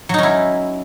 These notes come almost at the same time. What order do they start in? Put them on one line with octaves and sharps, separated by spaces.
F#3 D#4 C#4 E4